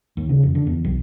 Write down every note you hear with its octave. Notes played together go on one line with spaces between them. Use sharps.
D#2
C#3
F2
D3
E2
B1